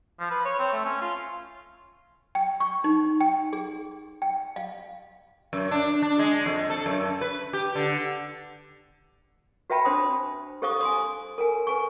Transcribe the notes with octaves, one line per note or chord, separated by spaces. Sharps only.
F3
B4
C#5
C4
A3
C#4
F4
G5
C#6
D#4
G5
G#4
G5
F5
F#2
D4
D4
G#3
F2
A4
F#2
B4
G4
D3
F#4 B4 E5 G5 A5 B5
D4 C5 C6 D#6
G4 A4 C5 F5 C#6 D#6
G#5 C6 D#6
A4 A#4 G#5
B4 G#5 C#6